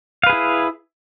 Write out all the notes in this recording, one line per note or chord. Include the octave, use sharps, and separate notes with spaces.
E4 G#4 B4 F5